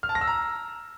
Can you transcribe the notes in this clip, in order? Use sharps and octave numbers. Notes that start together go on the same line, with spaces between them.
F6
A5
A#6
E6
A#5